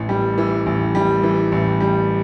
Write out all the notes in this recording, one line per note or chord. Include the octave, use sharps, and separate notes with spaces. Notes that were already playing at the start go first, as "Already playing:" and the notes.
Already playing: A1 E3
G3
E3
A1
G3
E3
A1
G3